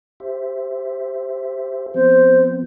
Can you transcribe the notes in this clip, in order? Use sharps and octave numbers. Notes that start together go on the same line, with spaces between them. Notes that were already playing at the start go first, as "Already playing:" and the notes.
G4 C5 E5
F3 B3 C4 C5